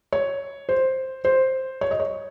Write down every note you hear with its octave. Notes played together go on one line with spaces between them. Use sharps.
C#5
C5
C5
C#5
D#5
C#5